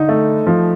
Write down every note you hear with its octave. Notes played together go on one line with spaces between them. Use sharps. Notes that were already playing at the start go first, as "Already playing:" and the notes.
Already playing: D3 D#4
A3
F3